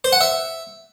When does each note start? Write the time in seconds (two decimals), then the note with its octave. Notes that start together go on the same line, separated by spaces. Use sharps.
0.04 C5
0.13 F#5
0.21 E5